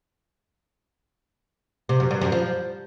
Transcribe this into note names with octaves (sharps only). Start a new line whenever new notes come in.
C3
F#2
G2
F#2
F3